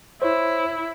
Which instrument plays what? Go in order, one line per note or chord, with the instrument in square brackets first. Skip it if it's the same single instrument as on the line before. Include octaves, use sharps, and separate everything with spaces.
[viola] E4 [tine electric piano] C5 C#5